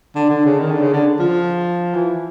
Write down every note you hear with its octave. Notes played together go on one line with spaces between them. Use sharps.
D3
D3
C#3
D#3
D3
C#3
D3
F3
E3